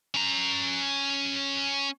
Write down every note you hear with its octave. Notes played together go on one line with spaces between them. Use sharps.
C#4 A#5